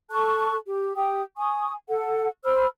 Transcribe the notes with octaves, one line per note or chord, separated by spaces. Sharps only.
A4 A5 C#6 F#6
G4
G4 G5 D#6
G#5 C#6 D#6
A4 F#5
C5 B5 E6 F6